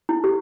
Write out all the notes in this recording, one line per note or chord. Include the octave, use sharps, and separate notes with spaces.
E4
G4